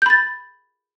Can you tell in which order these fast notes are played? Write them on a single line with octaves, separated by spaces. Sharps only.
G6 B5 A6